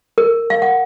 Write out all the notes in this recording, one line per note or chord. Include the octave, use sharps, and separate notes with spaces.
A#4
F5
F#5